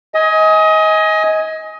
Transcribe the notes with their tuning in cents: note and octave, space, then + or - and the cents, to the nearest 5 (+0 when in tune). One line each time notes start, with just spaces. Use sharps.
D#5 +25 G#5 +0